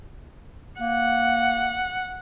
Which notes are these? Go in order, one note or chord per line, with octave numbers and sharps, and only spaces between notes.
A#3 F#5